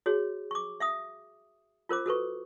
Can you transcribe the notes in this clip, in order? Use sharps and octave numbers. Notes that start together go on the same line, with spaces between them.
F#4 G#4 C#5
C#6 D6
E5 F5 D#6
F4 A#4 C5 D6
F#4 A4 B4 C#6